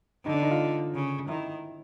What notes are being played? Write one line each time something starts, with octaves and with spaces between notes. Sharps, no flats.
D3 D#4
D4
D#4
F4
C#3
D#3 E4